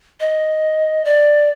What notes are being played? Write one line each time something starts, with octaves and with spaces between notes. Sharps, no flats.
D#5
D5